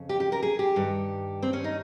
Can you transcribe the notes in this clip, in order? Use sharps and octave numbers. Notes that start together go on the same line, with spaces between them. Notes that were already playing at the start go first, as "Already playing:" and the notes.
Already playing: F2 C#3
G4
G4
A#4
G#4
G4
G2 D#3
C4
C#4
D#4